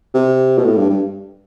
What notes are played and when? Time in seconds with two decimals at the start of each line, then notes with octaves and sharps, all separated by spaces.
0.14 C3
0.58 B2
0.65 A2
0.78 G2
0.89 G2